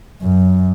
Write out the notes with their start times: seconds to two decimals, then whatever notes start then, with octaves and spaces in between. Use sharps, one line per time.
0.22 F#2